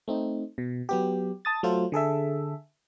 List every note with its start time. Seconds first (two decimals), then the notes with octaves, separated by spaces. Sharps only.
0.08 A3 C4 D#4
0.58 B2
0.89 F#3 B3 G4
1.45 A5 D#6 A6
1.63 F#3 A3 F4 A4 C5
1.92 D3 G#4 A4 E5